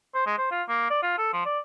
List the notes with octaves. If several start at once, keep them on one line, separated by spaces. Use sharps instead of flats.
C5
G#3
C5
F4
A#3
D5
F4
A4
F3
D5